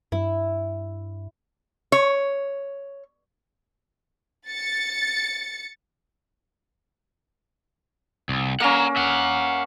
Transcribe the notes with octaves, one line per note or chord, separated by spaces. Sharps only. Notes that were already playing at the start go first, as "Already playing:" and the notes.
G2 E4
C#5
A6 C#7
C2
A#3 C#4 F#5 A#5
E5 F#5